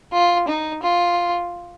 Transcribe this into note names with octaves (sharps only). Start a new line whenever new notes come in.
F4
D#4
F4